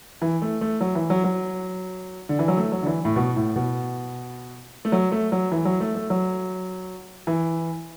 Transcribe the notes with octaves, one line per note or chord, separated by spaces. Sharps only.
E3
A3
A3
F#3
E3
F#3
F#3
D3
E3
F#3
A3
F#3
D3
E3
A2
B2
A2
B2
A3
F#3
A3
F#3
E3
F#3
A3
A3
F#3
E3